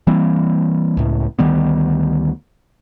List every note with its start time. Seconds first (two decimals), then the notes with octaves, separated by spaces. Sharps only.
0.07 E3 G3 A#3 C4
0.97 C#2 A2
1.39 D2 D#3 G3 B3